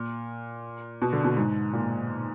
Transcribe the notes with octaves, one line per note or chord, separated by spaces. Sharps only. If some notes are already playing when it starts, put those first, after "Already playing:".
Already playing: A#2
B2
D3
B2
G#2
A#2